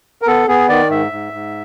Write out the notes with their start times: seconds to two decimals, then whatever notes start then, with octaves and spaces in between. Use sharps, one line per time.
0.22 A#4
0.27 B3 A4
0.48 B3 G#4
0.69 D#3 D5
0.90 G#2 E5
1.12 G#2
1.33 G#2